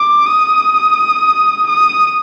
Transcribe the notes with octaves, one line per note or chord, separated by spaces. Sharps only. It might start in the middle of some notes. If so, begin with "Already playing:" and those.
Already playing: D6
D#6
D#6